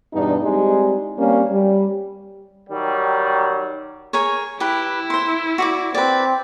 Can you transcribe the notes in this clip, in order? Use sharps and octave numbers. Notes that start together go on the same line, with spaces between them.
E2 G2 B2 B3 D4 D#4
G3 G#3 C4 D#4 E4 G4
G3 A#3 C4 C#4
G3
D#3 F#3 G3
G#4 A#4 C#5
E4 G4 B4
C5 C6
F#4 D5 D6
C4 B4 D5